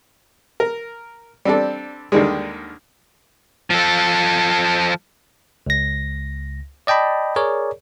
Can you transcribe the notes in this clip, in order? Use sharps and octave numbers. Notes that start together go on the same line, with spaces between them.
A#4
G3 C4 D4 A4
D#2 D3 D#3 G3 G#3
F3 A4
C#2 A#6
D5 D#5 G5 A5 B5
G#4 A#4 C#5 D5